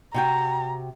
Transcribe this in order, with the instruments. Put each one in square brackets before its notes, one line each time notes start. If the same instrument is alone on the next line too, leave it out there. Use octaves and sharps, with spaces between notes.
[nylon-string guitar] C3 F#4 G5 [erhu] A#5